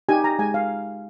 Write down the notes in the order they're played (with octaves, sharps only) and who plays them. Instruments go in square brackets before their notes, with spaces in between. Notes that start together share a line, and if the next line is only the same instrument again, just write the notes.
[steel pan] D#4 G4 G#5
A#5
G#3 G#5
F5